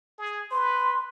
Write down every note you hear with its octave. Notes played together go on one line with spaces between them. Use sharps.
G#4
B4 C6